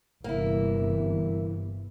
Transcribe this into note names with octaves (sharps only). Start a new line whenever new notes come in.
G1 C3 E3 A#3 E4